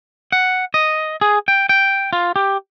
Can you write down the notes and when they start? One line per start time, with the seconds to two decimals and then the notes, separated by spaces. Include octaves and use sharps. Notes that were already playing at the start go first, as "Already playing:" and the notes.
0.32 F#5
0.74 D#5
1.21 G#4
1.48 G5
1.69 G5
2.13 F4
2.36 G4